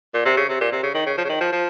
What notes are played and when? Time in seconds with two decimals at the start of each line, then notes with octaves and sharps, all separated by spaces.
0.14 A#2
0.25 C3
0.37 C#3
0.49 C3
0.61 A#2
0.72 C3
0.83 C#3
0.94 D#3
1.06 C#3
1.18 F3
1.24 C#3
1.29 D#3
1.40 F3
1.52 F3